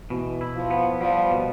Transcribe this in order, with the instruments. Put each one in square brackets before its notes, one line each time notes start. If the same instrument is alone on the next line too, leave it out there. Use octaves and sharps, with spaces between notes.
[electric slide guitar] B2 [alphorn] E3
[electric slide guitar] E4
[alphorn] F3
[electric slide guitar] B3
[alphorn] F3 [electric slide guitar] G3
[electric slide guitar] B2